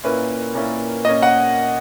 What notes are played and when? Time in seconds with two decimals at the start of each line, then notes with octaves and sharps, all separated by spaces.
0.04 A#2 A#3 C#4 E4 B4
0.55 A#2 A#3 C#4 E4
1.05 A#2 A#3 C#4 D#5
1.23 F#5